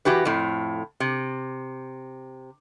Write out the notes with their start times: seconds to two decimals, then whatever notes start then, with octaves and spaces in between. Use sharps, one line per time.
0.05 E3 F#4 G4 B4
0.25 F2 A2
1.00 C3